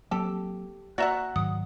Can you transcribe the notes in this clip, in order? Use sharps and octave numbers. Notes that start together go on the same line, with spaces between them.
F#3 A#3 C4 G4 A4
A#3 F#4 D5 E5 F#5 A#5
G#2 D#3 F#3 D#6